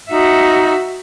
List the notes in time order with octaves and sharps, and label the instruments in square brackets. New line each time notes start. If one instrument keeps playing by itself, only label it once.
[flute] D#4 [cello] F#4 E5